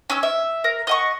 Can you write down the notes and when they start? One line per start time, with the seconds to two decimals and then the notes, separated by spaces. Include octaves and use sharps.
0.10 C#4 E6
0.23 E5
0.64 A#4
0.87 D#5 F#5 C#6